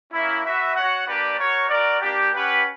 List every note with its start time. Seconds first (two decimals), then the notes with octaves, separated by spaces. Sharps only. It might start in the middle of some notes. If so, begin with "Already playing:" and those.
0.12 A#3 C#4 E4
0.44 F#4 B4 E5
0.75 F#4 C#5 F#5
1.07 A#3 D4 G4 B4 D5
1.38 F#4 A#4 C#5
1.70 F#4 A#4 D5
2.01 A#3 D4 G4
2.33 C#4 G4 B4 F#5